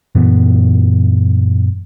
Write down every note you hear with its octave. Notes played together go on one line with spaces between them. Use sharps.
F#2 A#2 E3 B3